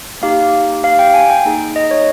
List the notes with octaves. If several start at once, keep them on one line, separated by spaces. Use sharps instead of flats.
A#3 D#4 G4 F5
F5
G5
G#5
G5
A#3 D#4 G#4
D#5
C#5